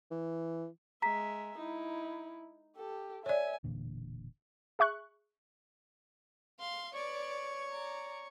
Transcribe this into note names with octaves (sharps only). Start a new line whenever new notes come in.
E3
G#3 E5 A#5 B6
D#4 E4
G4 A4
C#5 D5 E5 G#5
E1 E2 A#2 D3
G#4 E5 C#6 F#6
F5 C6
B4 C#5 D5 C#6
D5 A#5